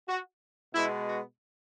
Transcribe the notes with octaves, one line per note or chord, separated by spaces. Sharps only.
F#4
B2 G#3 B3 E4
F#4